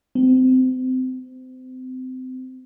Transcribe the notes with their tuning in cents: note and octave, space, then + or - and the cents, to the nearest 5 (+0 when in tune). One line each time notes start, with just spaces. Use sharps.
C4 -30